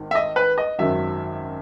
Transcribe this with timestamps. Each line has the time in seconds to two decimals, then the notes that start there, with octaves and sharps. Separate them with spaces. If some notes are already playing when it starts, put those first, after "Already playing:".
Already playing: G#1 D#3
0.11 E5
0.15 D#5
0.36 B4
0.58 D#5
0.79 G#1 F#2 D#3 F#3 E5